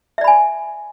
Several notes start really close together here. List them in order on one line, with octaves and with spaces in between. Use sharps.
E5 D5 B5 G#5